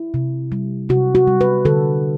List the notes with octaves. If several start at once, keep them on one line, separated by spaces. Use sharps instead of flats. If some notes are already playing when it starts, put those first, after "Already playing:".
Already playing: E4
C3
G3
C3 F#4
F#4
G3
B4
D3 A4